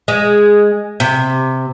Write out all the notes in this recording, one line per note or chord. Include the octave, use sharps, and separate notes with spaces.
G#3
C3